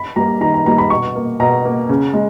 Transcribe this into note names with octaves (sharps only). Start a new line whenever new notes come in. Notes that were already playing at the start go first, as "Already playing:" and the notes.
Already playing: B5
G3 A#3 A#5
D#3 A#5
A#5
G3 A#3 A#5
B5
B2 C#6
A#3
B2 A#5
A#3
C#3
G#3